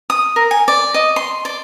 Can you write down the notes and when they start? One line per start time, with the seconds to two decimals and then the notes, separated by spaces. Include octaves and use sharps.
0.10 D#6
0.36 A#4
0.51 G#5
0.68 D5
0.94 D#5
1.16 C6
1.45 D5